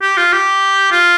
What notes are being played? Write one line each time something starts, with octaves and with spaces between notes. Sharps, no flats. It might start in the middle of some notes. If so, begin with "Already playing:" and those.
G4
F4
G4
F4